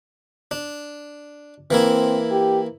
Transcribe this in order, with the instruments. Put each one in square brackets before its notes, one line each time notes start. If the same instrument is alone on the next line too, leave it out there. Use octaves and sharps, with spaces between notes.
[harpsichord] D4
[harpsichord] E3 A#3 E4 [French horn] C4
[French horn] G4